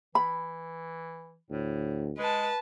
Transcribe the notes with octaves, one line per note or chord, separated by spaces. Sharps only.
E3 B5
D2 A2
G#3 B4 A5